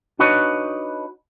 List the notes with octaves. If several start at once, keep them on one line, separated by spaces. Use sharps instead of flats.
D4 D#4 F#4 B4 C#5 D#5